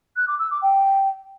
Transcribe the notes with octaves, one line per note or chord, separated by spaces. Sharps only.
F#6
D6
E6
D6
G5